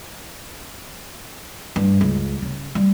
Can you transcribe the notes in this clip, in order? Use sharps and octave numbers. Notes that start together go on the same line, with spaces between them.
G2
C#2
C#3
G3